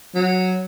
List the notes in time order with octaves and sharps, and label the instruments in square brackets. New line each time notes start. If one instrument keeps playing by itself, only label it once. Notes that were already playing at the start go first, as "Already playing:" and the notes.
[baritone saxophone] F#3